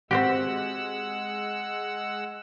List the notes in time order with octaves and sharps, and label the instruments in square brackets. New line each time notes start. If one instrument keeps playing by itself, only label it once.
[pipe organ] G#3 F#5 E6 [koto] C4 F#4 G4